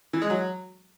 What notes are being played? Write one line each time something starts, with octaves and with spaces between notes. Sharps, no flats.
E3
G#3
F#3